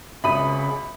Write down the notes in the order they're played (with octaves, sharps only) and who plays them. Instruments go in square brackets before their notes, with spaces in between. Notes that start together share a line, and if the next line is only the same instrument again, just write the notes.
[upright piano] G#1 C#2 [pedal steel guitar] C#3 [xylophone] E5 D#6 D#7 [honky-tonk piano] B5